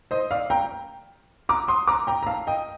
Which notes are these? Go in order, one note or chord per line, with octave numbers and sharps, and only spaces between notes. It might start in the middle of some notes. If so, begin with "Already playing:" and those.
C5 D#5
D5 F5
G5 A#5
A#5 D6
C6 D#6
A#5 D6
G5 A#5
A#5
F5 A5
D#5 G5